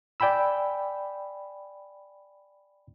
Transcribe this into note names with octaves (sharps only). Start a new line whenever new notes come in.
D5 G5 G#5 B5 E6